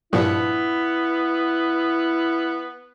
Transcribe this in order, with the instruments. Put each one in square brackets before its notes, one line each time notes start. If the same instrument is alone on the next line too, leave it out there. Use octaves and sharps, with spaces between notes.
[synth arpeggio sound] G2 A#2 F3 [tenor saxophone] B3 [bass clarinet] E4